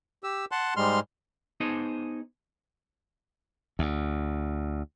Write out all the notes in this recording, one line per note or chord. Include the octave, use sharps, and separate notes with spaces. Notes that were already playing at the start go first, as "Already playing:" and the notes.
G4 E6
F#5 A5 C6 F#6
G#2 G3 G#3 C6 F6
B3 D#4 G#4 C5 D#5 A5
D2